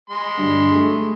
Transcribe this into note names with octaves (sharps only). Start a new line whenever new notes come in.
G#3 B5 C6
G2 D3 G3
A3 G#4